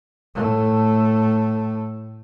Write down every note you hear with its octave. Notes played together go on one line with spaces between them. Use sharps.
A2 A3